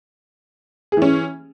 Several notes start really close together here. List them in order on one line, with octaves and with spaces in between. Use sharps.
G#4 E3 C#4